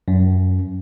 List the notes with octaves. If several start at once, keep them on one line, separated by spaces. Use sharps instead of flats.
F#2